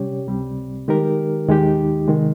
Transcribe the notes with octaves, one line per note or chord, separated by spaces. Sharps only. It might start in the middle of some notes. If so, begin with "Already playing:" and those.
Already playing: C3 G3 C#4 G4 C#5
C#2 C3 G3 C4
D#3 G#3 D#4 G4 A#4
D#2 D#3 G#3 D#4 G4
C3 D#3 G#3